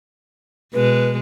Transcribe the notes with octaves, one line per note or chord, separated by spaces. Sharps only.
B2 G#3 B4